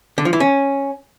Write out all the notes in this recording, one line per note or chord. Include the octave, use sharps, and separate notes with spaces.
D3
F3
E3
C#4